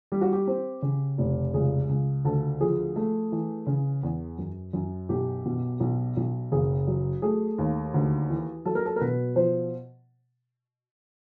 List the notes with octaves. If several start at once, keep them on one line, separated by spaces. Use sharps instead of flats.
G3 G4
F#4
G4
C4
C#3
F1
C#2 G#4
C#2
D2 A4
F3 G#4
A3
E3
C#3
E2
F#2
F#2
B1 G4
B2
B1
B1
F#1 G#4
F#3
A3 G#4
D#2
D2
E3
F#3 A4
A#4
A4
A#4
B2 B4
F3 C5